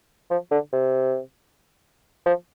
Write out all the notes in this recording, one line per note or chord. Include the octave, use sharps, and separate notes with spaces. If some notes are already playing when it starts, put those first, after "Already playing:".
F3
D3
C3
F3